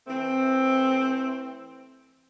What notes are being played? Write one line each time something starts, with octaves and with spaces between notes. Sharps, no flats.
E3 A3 C4